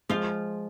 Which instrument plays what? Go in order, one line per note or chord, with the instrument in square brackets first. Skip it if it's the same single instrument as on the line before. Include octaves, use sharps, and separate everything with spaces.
[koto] F3 F4 [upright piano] G#3